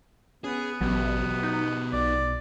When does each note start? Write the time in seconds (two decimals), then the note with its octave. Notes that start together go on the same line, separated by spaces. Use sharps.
0.44 B3 C#4 G#4
0.81 A1 B2 F#3 G4
1.43 D#4
1.93 B1 D5